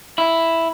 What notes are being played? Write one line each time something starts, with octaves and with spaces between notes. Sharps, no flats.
E4